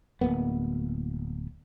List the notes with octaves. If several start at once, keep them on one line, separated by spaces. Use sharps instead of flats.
D1 G#1 A#3 B3